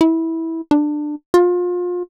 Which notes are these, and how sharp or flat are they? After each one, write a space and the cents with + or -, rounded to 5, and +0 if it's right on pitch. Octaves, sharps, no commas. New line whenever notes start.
E4 -15
D4 +20
F4 +30